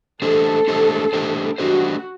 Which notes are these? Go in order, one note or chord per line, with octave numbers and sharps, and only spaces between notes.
A3 D4 G4 A4 C5
A3 D4 G4 C5
A3 D4 G4 C5
A3 D4 F#4 G4 C5